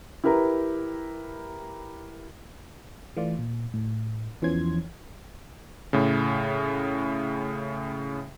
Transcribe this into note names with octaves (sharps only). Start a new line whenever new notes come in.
E4 G4 A#4 B4 A#5
E3 A3 F4 D5
A#2
A2
E2 E3 F3 C#4 C6 G#6
A2 C#3